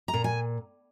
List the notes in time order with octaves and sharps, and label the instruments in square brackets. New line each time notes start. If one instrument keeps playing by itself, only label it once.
[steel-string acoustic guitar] A#5
A#2
G#5